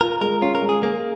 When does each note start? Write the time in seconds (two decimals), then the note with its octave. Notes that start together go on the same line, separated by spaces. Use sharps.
0.01 F4 A#4
0.21 G#3 A#4
0.42 C#4 F4
0.55 A#4
0.62 G#3
0.69 G#4
0.82 A#3 G#4